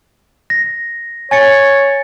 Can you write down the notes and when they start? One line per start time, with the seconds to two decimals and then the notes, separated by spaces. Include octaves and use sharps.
0.50 A#6
1.31 C#5 G#5 A6 C#7